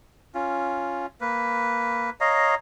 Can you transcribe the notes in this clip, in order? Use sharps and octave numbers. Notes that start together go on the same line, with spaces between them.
C#4 F4
A#3 B4
C#5 D#5 F5 A#5